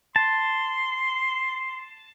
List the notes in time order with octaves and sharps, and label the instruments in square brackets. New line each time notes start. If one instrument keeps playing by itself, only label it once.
[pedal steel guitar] A5 [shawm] C6